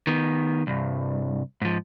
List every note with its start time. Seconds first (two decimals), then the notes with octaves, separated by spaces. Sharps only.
0.07 D#3 B3
0.67 C2 G2
1.62 G#2 F3